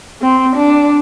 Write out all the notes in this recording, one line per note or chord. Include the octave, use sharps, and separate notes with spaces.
C4
D4